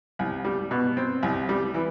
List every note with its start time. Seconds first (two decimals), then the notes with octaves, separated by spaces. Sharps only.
0.19 C2
0.45 G3
0.71 B2
0.97 C4
1.23 C2
1.49 G3
1.74 E3